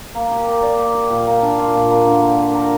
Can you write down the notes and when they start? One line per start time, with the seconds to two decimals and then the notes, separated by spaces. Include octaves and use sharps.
0.15 A#3
0.31 G4
0.47 A#4
0.63 D5
0.79 A#3
0.95 G4
1.10 A#2
1.27 A#3
1.42 D4
1.58 F4
1.75 A#2
1.90 A#3
2.06 D3
2.22 A#3
2.38 G4
2.54 A#4